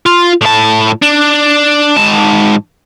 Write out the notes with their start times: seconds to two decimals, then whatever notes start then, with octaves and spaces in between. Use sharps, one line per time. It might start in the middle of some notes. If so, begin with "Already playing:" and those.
0.06 F4
0.41 A2 A5
1.02 D4
1.96 G#2 A5